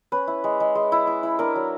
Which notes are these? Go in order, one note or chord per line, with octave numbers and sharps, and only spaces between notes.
C#4 B4
E4
G#3
G#3
G#3
E4
E4
E4
D4 A#4
F#3